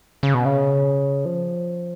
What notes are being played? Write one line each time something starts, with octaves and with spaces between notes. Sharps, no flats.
C#3
B2
C#3
F3